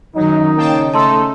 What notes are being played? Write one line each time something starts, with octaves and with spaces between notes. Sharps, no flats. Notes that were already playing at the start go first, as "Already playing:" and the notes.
F#2 D#3 F#3 D#4
C#3 A#3 C#4 G5 A5
A3 D#4 A4 A5 C6 E6